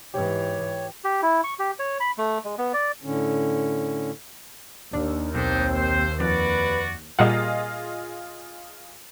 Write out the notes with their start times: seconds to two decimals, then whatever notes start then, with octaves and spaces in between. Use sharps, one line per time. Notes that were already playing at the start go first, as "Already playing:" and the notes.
0.14 G#2 E3 G4 C#5
1.04 G4
1.22 E4
1.44 C#6
1.59 G4
1.79 C#5
2.00 B5
2.18 A3
2.44 G#3
2.58 B3
2.73 D5
3.03 A2 D3 C#4
4.93 D#2 D4
5.35 B1 C4 D4 D#4 C5
5.74 C5
6.20 F2 F#4 B4 D5
7.19 A#2 G3 F4 G#4 D#5 F#5